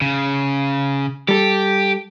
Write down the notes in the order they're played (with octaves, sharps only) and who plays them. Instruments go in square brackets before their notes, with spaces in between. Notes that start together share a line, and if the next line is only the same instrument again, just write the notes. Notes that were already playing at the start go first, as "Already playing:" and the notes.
[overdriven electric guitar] C#3
[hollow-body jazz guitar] G3 A4 [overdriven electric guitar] G4